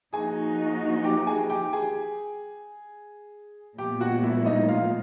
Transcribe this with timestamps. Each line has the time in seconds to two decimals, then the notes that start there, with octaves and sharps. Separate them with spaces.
0.13 F3 A#3 D#4 F#4 G#4 G#5
1.04 G4 G5
1.27 G#4 G#5
1.50 G4 G5
1.73 G#4 G#5
3.78 A#2 F3 G#3 B3 G4 G5
4.00 F#4 F#5
4.23 E4 E5
4.46 D#4 D#5
4.69 F4 F5